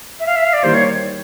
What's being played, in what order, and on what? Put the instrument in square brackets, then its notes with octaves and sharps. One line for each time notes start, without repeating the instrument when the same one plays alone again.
[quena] E5
F5
E5
F5
D5
[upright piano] D#3 G3 A#3 [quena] C5
[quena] C#5